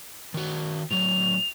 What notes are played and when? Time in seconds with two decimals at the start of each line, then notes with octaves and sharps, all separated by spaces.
0.34 D#3 F#4
0.91 A2 F#3 F7